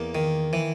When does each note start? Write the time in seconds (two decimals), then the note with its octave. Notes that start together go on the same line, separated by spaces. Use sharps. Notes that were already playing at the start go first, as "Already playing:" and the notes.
Already playing: E2 A#3
0.15 D#3
0.53 E3